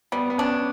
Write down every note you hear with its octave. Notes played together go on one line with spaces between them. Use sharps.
G3 B3
B3
C#4 D4